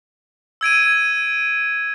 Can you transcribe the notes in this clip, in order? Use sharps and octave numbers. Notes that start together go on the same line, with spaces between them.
E6 G#6 D7 D#7